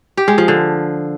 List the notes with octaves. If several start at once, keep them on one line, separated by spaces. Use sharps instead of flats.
G4
G#3
F3
D3